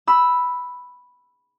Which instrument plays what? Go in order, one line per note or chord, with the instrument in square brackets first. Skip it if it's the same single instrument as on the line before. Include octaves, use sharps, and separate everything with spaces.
[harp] B5 E6